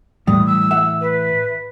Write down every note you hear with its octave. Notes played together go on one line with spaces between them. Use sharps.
A2 E3 G3 D#6
E6
E5 F#5
B4